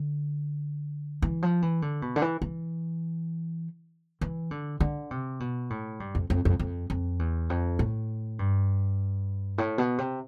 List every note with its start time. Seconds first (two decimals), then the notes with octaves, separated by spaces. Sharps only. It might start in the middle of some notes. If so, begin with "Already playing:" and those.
Already playing: D3
1.22 E3
1.42 F3
1.62 E3
1.82 D3
2.02 B2
2.16 D3
2.22 E3
2.42 E3
4.21 E3
4.51 D3
4.80 D3
5.11 C3
5.40 B2
5.70 A2
6.00 G2
6.15 F2
6.30 F2
6.45 F2
6.59 F2
6.90 F2
7.19 E2
7.50 F2
7.79 A2
8.39 G2
9.58 A2
9.78 B2
9.98 C3